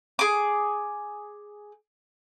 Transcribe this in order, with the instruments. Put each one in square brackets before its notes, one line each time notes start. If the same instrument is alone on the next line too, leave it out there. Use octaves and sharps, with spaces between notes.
[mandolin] G#4 D6